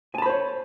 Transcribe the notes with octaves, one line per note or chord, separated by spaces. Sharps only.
C5 C#5 G#5 A5 B5